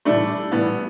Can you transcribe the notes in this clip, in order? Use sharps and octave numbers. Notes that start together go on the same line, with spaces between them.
A2 E3 G3 A3 D4
A2 E3 G3 B3